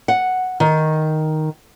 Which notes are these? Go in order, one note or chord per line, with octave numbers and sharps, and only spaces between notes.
F#5
D#3